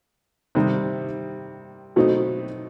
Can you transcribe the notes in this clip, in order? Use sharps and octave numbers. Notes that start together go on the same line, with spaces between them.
C3 D#3 G3
B2 F#3 A3 C4 D#4